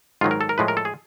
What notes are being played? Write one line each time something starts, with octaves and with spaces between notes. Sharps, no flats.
G#2 D#3 F#3 F4
A#4
A4
A#4
A2 F3 G#3 B4
A#4
A4
G#4